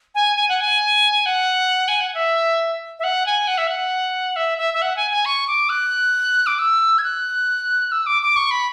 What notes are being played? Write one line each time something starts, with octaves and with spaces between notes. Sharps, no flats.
G#5
G#5
F#5
G#5
F#5
G#5
F#5
E5
E5
F#5
G#5
F#5
E5
F#5
E5
E5
E5
F#5
G#5
G#5
C#6
D6
F#6
D6
E6
G#6
F#6
E6
D6
D6
C#6
B5